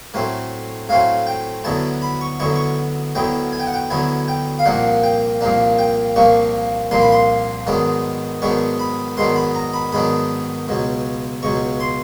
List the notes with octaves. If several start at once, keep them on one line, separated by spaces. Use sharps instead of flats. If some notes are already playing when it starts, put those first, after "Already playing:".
A2 F#3 A3 C4
A2 F#3 A3 C4 F5
G5
D2 D3 F#3 B3 E4 A5
B5
C#6
D2 D3 F#3 B3 E4 C#6
C#6
D2 D3 F#3 B3 E4 G5
G#5
G5
F#5
G5
D2 D3 F#3 B3 E4 G#5
G5
F5
C2 A#2 F3 A#3 D4 F#5
G5
C2 A#2 F3 A#3 D4
G5
C2 A#2 F3 A#3 D4 C#6
C2 A#2 F3 A#3 D4 C6
B5
C6
G#2 D#3 F#3 B3 D4
G#2 D#3 F#3 B3 D4 C#6
B5
G#2 D#3 F#3 B3 D4 C6
B5
A#5
B5
G#2 D#3 F#3 B3 D4 B5
C#2 B2 F#3
C#2 B2 F#3 C#6
C6